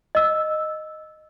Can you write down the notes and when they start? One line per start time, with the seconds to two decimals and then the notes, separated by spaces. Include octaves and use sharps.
0.15 D#5 E6